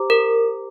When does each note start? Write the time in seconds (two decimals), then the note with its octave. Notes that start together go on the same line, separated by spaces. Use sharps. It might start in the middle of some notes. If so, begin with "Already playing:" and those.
Already playing: G4 C5 A#5 D6
0.10 A#4